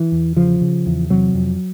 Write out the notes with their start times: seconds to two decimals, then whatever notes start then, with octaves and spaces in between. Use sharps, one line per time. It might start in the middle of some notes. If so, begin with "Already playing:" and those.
Already playing: E3
0.12 E2
0.37 C#3 F3
0.61 C#3
0.86 E2
1.10 C3 F#3
1.34 F2